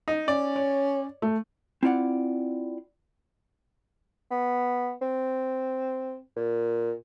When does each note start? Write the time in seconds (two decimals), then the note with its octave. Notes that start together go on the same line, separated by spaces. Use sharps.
0.08 D#4
0.28 C#4 D5
0.56 C#5
1.22 A3
1.83 C4 E4 F4 D5 F#5
4.31 B3
5.01 C4
6.37 A#2